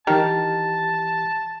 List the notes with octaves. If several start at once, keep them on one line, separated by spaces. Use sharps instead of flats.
D#3 E3 G4 A5